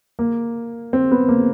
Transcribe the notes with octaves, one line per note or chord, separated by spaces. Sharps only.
A#3
C4
B3
A#3